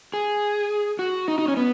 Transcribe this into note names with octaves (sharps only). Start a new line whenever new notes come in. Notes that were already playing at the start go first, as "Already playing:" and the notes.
G#4
F#4
D#4
D#4
C#4
B3